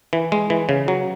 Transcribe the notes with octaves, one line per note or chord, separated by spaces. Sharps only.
E3
G#3
E3
C#3
F#3